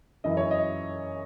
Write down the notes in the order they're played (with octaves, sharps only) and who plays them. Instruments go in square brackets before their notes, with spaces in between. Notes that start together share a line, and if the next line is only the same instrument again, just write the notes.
[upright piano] F#2 E3 D#5
C#5
D#5